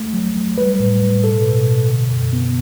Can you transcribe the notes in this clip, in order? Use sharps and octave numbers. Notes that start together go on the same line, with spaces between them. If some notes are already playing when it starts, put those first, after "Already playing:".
Already playing: A3
F#3
F#3
G3 B4
A2
A2
B2 A4
B2
B2
D3
F#2
B3